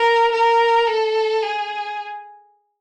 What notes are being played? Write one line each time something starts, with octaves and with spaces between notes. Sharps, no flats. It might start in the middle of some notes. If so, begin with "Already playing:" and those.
Already playing: A#4
A#4
A4
G#4